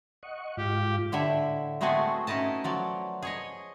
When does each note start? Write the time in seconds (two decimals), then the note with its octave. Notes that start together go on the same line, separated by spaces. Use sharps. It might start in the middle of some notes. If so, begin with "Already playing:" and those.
0.23 D#5 F#5 C#6
0.57 G#2 F4 G4
1.12 A2 D3 E4 E5
1.81 G#3 A3 B3 C4 F#4 G#4
2.27 C#4 D#4 E4 D#5 A5
2.64 F3 F#3 D5
3.22 G#4 C#5 D#5